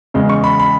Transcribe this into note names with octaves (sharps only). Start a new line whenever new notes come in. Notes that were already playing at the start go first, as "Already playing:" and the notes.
E2 C#3 G#3
C#6
B5
B5